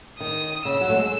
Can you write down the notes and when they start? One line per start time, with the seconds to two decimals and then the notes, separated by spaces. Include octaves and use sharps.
0.19 D#3 D#6
0.65 C#3 E6
0.81 F#3
0.90 A3
0.97 G#3